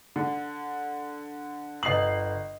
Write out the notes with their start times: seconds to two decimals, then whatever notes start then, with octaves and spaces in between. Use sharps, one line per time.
0.16 D3
1.83 G1 D#5 D#6 C7 F#7